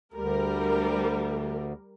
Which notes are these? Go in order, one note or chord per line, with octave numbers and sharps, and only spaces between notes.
D2 G3 A#4